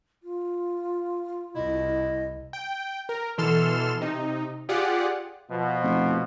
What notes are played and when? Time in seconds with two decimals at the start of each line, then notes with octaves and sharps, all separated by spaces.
0.23 F4
1.56 C2 E4 D#5
2.53 G5
3.09 A#4
3.38 B2 E3 A4 C6 F6 E7
4.01 C3 D#4
4.69 F4 G4 G#4 D5 F#5
5.50 B2 F3
5.84 F1